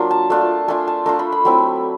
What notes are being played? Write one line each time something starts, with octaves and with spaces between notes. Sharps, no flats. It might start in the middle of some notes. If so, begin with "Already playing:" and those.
Already playing: F#3 A#3 D4 F4
A5
A3 D4 F4 A5
A3 D4 F4 G#5
A5
A3 D4 F4 A#5
B5
B5
F#3 A3 C4 E4